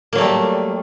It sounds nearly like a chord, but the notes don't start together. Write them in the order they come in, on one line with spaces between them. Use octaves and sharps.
A#3 F#3 A3 G3